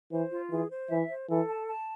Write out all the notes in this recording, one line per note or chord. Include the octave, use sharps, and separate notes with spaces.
E3 C5
F4
E3 G#4
C5
E3 E5
C5
E3 A4
A5
A5